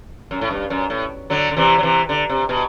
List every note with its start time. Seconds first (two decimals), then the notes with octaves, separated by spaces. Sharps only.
0.31 F#2
0.41 A2
0.51 G2
0.70 F#2
0.90 A2
1.30 D3 F#3
1.51 D3
1.56 C3 E3
1.78 F#3
1.83 C3 E3
2.09 D3
2.29 C3
2.49 B2